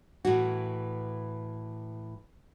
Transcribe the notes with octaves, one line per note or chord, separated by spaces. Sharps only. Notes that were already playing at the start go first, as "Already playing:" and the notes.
A2 E3 F#4